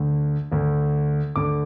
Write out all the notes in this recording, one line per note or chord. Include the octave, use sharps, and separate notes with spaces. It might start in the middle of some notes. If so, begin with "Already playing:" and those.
Already playing: D2 D3
D2 D3
D2 D3 D6